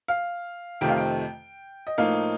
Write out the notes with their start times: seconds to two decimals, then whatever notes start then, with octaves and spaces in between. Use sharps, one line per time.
0.08 F5
0.81 F2 C3 D#3 A3 G5
0.89 F5
0.97 G5
1.87 D#5
1.98 A2 F3 A#3 D#4 F5